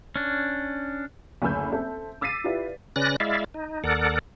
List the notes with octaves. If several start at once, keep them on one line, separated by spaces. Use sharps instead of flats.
C#4 D4
F#1 D2 G#5 B5 E6 G6
C4 A4 E5
D6 E6 A6 B6 C7 D#7
E4 F4 G4 B4 D5 E5
C#3 C#4 B4 D5 F#6 A#6
G#3 E4 D5 E5 F5
D#4
D#2 A4 A#4 D5 F#5